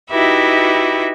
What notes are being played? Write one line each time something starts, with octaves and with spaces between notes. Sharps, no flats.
D#4 E4 F#4 G4 B4 E5